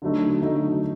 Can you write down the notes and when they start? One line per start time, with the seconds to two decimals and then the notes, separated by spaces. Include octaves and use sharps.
0.02 D3 F#3 A3 D#4
0.42 D3 F#3 A3 D#4